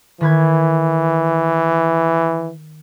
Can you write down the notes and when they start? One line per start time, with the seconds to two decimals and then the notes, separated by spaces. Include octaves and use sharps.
0.21 D#3 E3 B4 G#6